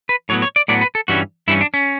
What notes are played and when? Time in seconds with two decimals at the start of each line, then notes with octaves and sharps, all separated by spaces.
0.09 B4
0.29 A2 F#3 B3 C#5
0.42 C#5
0.56 D5
0.68 A2 F#3 B3 D5
0.81 B4
0.95 A4
1.08 G2 E3 G3 C#4 F#4
1.48 G2 E3 G3 C#4 E4
1.61 D4
1.74 C#4